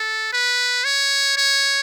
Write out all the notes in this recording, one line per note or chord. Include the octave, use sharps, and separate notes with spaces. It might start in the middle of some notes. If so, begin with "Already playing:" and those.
Already playing: A4
B4
C#5
C#5